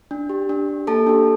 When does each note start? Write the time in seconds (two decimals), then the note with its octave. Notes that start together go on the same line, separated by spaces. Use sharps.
0.11 D4
0.29 G4
0.49 D4
0.68 G4
0.87 A#3 A4 A5
1.07 D4 G4